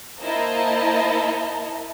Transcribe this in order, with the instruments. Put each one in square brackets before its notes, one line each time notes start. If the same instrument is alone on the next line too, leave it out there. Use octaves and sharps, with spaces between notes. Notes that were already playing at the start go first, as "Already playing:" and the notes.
[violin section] A#3 E4 C5 D#5 A5 A#5